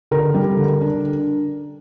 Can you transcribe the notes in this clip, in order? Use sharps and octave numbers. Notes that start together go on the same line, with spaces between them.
D3 A#4
G3
D3
D4